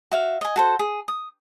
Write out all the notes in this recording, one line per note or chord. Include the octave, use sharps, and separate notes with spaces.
F#4 E5 F5
D#5 G#5
F#4 A4 C5
G#4
D#6